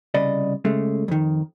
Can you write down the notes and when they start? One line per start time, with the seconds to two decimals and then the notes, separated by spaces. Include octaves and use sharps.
0.14 C2 C#3 D5 D#5 B5
0.65 C#3 G#3 A3
1.08 F2 D#3